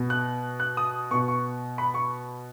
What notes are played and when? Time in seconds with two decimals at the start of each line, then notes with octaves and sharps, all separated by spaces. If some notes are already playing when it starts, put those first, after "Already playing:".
Already playing: B2 B3
0.10 F#6
0.60 F#6
0.77 D#6
1.11 B3 C#6
1.14 B2
1.28 C#6
1.78 B5
1.94 C#6